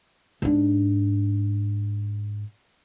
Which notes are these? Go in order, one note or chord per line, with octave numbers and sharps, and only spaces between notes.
G#2 D4